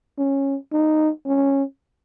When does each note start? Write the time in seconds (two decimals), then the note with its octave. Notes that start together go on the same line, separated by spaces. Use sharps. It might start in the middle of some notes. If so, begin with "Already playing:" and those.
0.18 C#4
0.72 D#4
1.26 C#4